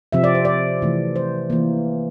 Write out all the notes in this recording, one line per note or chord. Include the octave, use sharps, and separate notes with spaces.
C3 F3 C4 E5
D5
C5
D5
C3 E3 A3
C5
E3 A#3